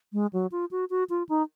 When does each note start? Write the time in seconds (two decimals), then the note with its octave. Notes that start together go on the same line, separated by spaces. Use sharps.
0.13 G#3
0.33 F#3
0.52 F4
0.71 F#4
0.90 F#4
1.10 F4
1.29 D#4